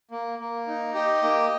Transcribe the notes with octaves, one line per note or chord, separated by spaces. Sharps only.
A#3
A#3
D#4
G4 D#5
A#3